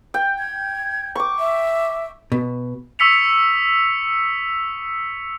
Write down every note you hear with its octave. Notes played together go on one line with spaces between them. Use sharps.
G5
G#6
C#6 D6
E5
B2
C#6 D#6 E6 B6 C#7 F7